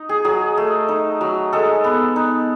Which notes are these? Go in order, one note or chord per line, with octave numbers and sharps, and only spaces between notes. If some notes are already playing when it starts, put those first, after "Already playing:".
Already playing: D#4
G#4
F#3 G#4
A3
D#4
F#3
G#3 A4
B3
D#4